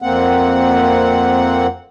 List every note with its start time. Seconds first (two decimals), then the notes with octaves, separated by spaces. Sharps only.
0.02 F2 A#3 C4 F#5